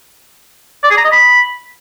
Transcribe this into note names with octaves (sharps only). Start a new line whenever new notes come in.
D5
G#4
A#5
D#5
B5